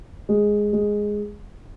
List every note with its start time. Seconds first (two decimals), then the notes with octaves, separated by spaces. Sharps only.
0.29 G#3
0.73 G#3